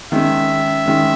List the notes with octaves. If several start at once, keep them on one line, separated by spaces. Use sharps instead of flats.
D#3 G#3 C#4 E5
D#3 G#3 C#4